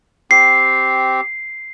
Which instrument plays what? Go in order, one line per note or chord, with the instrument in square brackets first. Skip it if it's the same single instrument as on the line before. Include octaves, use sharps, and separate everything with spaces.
[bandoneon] C4 G4 [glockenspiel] C7